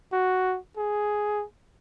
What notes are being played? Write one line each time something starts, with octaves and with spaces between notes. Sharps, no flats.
F#4
G#4